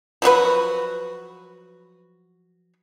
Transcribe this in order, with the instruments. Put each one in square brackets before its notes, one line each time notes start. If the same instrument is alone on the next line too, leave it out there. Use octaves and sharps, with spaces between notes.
[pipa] F3 F#3 F#4 B4